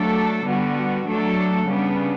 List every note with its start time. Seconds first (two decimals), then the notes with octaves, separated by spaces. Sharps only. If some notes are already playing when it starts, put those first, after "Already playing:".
Already playing: F#3 A3 D4 A4
0.46 D3 G3 B3 F#4
1.07 F#3 A3 D4 A4
1.66 C#3 G3 B3 D4